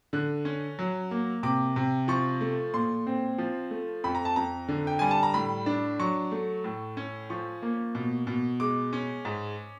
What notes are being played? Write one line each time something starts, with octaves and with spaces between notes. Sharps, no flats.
D3 F#6
C#4
F#3
A#3
C3 D6
C3
F3 C#6
A3
A#2 C6
C4
F3
A3
F2 B5
A#5
A5
F2 A#5
D3
G5
G3 G#5
A5
A#5
A2 B5
D4
F#3 C#6
A3
A2
C#4
F3 C#6
A#3
B2
B2
G#3 D6
C#4
G#2